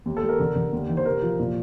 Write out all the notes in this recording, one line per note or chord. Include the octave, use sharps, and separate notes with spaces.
D#2
A4
G3
A#4
D3
D3
D#2
D#3
C5
C3 A#4
F3
A#2